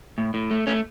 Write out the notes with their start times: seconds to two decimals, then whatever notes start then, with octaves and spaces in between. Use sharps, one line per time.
0.18 A2
0.34 A2
0.51 A3
0.67 A3 C#4